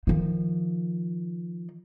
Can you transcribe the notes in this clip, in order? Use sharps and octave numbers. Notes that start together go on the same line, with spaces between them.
D#3 F3